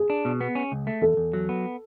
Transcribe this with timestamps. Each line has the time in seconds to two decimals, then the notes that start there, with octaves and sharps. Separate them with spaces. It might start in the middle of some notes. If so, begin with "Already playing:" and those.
Already playing: G#4
0.10 D4
0.25 B2
0.41 B3
0.55 C#4
0.72 C#2
0.87 A3
1.02 E2 A4
1.17 E2
1.33 F#3
1.49 B3